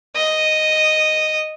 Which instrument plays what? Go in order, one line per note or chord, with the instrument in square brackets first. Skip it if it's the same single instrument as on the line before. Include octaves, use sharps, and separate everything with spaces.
[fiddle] D#5